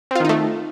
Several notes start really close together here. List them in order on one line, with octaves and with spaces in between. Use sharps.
C4 F4 D#3 D#4 A3